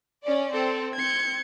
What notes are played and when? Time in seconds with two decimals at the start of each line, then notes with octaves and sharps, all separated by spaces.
0.23 C#4 D5
0.53 C4 A4
0.95 C4 G6 G#6 C#7